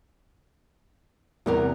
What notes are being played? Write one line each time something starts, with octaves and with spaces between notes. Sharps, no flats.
E2 C3 G3 B3 A#4